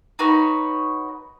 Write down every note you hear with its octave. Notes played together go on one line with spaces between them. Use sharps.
D#4 F#4 B4 C#5